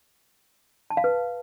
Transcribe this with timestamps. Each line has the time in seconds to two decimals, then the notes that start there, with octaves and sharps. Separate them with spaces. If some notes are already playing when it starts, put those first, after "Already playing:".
0.90 A5
0.97 F5
1.04 B4